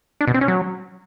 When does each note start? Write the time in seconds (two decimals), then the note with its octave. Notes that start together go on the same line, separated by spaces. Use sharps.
0.21 D4
0.27 B2
0.34 C4
0.41 C#4
0.48 F#3